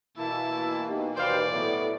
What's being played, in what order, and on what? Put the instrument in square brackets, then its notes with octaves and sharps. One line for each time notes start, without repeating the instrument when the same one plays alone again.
[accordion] B2 E3 A#3 [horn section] E4 [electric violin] A5
[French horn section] B3 D#4 G4
[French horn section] D#2 B4 [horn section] C5 F5 G5 [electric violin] D5
[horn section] A2 F#3 [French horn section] B3 E4 A4